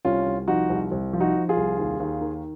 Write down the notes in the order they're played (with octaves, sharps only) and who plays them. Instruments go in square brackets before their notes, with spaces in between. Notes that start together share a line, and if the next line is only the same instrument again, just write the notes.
[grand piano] C2 C#4 F4
C2
F3 D#4 F#4
C2
C2
F3
D#4 F#4
F3
F4 G#4
C2
D#2
D#2
D#3